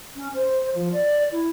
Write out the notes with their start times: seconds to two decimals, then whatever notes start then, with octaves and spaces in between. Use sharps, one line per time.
0.16 C#4
0.35 C5
0.75 F3
0.92 D5
1.32 E4